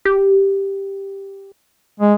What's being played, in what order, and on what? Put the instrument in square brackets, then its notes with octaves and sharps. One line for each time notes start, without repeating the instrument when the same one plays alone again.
[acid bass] G4
[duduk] G#3